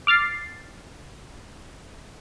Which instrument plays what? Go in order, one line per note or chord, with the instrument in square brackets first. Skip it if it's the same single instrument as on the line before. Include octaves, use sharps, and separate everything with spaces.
[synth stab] D6 F6 A6 C7